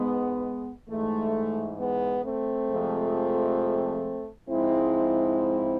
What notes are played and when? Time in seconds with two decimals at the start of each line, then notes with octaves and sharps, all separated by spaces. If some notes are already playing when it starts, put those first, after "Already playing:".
Already playing: G#2 G#3 B3
0.88 G#2 E3 G#3 A3
1.79 G#3 B3
2.23 A3 C4
2.68 F2 C3 F3 G#3
4.48 G#2 F3 G#3 C4 E4